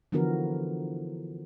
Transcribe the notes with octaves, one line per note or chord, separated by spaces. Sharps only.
D3 E3 F3 B3 F#4 A#4